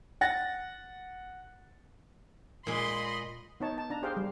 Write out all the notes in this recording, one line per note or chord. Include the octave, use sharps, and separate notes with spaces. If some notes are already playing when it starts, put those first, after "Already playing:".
F#5 A6 A#6
A#2 G#3 D#5 B5 C6
B3 D#4 C#5 A5
A5
D4 A#5
G4 G#4 C5 F5 G5
G3